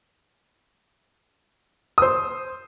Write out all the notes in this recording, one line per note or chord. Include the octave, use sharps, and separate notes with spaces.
C5 D#6